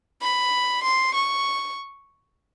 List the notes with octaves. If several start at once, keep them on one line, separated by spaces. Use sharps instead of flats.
B5
C6
C#6